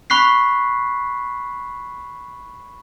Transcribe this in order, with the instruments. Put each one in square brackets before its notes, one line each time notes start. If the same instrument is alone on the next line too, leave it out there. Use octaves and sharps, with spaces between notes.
[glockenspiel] B5 C#6 F#6 B6 C7